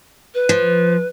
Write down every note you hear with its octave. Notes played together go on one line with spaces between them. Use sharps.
B4
F3